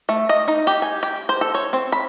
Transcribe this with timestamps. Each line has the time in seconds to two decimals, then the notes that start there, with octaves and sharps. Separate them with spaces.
0.09 A3
0.29 D#5
0.48 D#4
0.67 G4
0.82 G#5
1.03 G4
1.29 C5
1.41 A4
1.55 C#5
1.73 C4
1.92 B5